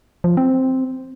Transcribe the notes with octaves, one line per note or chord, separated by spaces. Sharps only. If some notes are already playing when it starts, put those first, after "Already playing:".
F3
C4